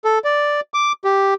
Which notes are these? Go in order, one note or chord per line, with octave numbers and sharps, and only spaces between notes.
A4
D5
D6
G4